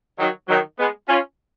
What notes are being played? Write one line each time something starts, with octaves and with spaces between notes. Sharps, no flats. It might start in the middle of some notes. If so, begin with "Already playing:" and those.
D#3 F#3
D#3 F#3
G#3 B3
C#4 F4